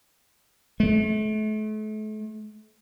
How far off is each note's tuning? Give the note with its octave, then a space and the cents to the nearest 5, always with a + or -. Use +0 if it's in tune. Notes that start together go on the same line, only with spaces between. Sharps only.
A3 -40